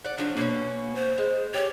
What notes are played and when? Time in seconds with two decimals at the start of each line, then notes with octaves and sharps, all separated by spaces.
0.04 D5 F#5
0.18 F3 F#3 D4
0.37 B2 A#3 C#4
0.95 C5
1.18 G#3
1.54 C#4 G4 C#5